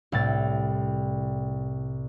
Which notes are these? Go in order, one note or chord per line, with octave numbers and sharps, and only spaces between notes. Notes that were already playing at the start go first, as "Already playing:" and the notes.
C2 A2 A6